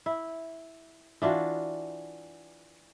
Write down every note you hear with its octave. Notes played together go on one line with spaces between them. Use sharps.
E4
E3 D4 F4 F#4